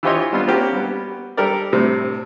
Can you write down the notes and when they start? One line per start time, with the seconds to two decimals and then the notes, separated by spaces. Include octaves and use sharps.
0.03 E3 F4 G4 C5 C#5 D#5
0.33 G3 B3 D4 F4 F5
0.48 A#3 C4 C#4 F#4 G4
0.73 G3 B3
1.37 G3 G4 A4 A#4 D5
1.73 A2 C3 G3